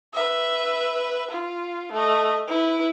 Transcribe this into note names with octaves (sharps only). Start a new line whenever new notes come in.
B4 E5
F4
A3 D#5
E4 B4